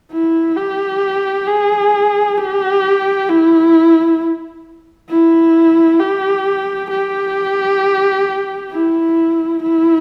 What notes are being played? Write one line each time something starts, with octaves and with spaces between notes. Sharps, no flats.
E4
G4
G#4
G4
E4
E4
G4
G4
E4
E4